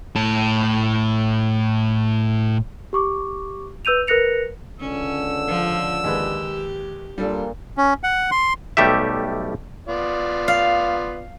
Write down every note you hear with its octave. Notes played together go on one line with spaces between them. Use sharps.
A2 A5
G4 C#6 D6
B4 E6 G6 D#7 F7
A#4 B4 F#6 A#6 C#7 F7
C#2 D3 C#4 E6
F3
D#2 G#3 G4 B4
A#2 G3 D4 A4
C#4
F#5
C6
B1 G3 A3 G4 E5
B3 F4 D5
F5